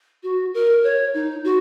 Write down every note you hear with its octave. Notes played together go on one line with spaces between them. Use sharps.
F#4
A#4
C#5
D#4
F#4